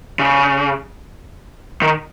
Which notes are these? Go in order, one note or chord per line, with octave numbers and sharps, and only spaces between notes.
C#3
D#3